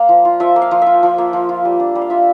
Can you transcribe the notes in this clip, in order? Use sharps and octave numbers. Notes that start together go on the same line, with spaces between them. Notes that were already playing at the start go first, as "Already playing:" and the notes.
Already playing: A#3 D5 F5
F3
F4
F3 E5
A#3
F5
F3
F4 E5
F3
A#3
F3
F4
G3
D4
G3
F5
F4 E5